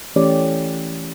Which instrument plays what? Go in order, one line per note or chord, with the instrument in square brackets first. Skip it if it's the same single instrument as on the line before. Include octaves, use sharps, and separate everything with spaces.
[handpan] E3 A3 C#4 G4 D5